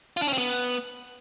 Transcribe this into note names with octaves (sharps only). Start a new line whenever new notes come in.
F4
D4
C#4
C4
B3